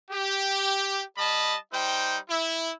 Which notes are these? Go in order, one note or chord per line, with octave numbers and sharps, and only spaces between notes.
G4
G3 D#5 A5 B5
G3 D#4 C5 G5
E4